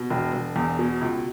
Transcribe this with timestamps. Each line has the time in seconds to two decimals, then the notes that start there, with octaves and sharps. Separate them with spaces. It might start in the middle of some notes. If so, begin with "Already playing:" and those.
Already playing: B2
0.10 E1
0.33 E1
0.56 E2
0.79 B2
1.01 C#2